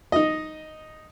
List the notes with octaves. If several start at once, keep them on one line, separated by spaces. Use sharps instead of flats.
D#4 D#5